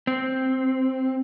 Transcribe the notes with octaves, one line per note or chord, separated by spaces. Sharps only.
C4